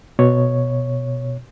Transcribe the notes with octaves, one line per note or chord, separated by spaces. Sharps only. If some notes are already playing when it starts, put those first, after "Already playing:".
B2 C#5